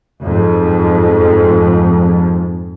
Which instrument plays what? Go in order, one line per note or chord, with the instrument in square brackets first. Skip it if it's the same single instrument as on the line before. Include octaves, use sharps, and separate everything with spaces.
[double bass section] F2 G#2